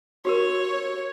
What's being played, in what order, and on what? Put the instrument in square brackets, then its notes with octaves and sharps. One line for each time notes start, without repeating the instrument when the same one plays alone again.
[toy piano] F#4 G4 A#4 [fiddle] C#5